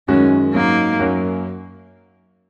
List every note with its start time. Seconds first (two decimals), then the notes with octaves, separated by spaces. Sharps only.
0.08 F#2 D#3 G#3 C#4 F#4
0.54 G#2 F#3 A#3 D#4
1.00 F#2 F#3 A#3 C#4 F#4